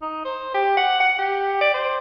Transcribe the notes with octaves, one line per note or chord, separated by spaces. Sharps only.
D#4
C5
G4
F#5
F#5
G4
D5
C5